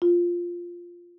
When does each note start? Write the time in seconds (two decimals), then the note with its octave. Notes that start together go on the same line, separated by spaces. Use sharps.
0.02 F4